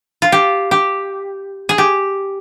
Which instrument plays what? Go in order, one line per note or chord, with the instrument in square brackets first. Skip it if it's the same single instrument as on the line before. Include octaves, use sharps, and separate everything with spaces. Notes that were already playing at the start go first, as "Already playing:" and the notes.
[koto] F4
G4
G4
G#4
G4